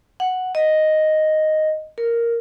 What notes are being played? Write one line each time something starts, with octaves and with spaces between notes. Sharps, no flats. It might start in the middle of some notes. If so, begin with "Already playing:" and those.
F#5
D#5
A#4